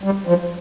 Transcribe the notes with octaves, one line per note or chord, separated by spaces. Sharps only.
G3
F3